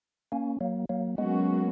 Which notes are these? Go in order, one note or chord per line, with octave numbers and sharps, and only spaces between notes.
A#3 C#4
F#3 A#3
F#3 A#3
F#3 G#3 A#3 B3 C#4 F#4